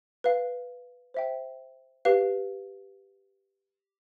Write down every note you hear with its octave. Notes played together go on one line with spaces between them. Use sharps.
B4 F5
C5 E5 G5
G4 B4 F5